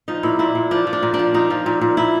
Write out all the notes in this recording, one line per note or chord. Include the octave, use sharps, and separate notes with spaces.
F3 D#4
A#2 E4
A#2 E4
A#2
F3 D4
F3
D4
A#2
D4
F3
A#2 D#4
F3
A#2
A#2
A#2 E4